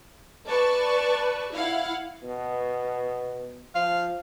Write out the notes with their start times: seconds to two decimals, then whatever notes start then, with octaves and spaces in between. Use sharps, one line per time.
0.48 B4 D5 A5 C#6
1.53 E4 F5 F#5
2.23 B2
3.75 F3 F5